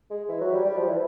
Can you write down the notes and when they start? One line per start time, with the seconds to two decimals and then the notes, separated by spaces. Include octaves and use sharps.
0.10 G#3
0.29 E3
0.41 F#3
0.53 G3
0.65 G3
0.77 F3
0.88 E3